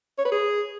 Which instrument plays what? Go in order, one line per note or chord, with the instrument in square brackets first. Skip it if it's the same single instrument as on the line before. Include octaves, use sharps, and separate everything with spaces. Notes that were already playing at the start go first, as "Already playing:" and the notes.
[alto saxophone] C#5
B4
G#4